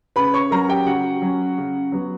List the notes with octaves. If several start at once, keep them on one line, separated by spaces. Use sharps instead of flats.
C#3 B4 B5
C#5 C#6
F#3 C#4 A#4 A#5
G4 G5
C#3 F#4 F#5
F#3 C#4
C#3
F#3 B3